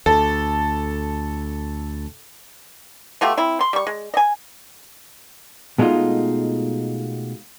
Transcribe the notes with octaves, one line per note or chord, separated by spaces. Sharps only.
D2 A4
B2 A3 F4 G4
C4 E4
C6
G3 C#6
G#3
D#5 G#5
B2 G#3 A3 D#4 F4